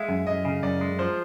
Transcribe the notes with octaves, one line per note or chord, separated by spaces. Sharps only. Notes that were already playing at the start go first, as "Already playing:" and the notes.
Already playing: G#3 E5 F5
F#2
F#2 D#5
C#3
F#2 D5
G#3
F3 C5